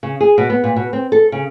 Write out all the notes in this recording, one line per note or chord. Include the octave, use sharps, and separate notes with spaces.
C#3
G#4
B2
B3
A#2
B2
C4
A4
C#3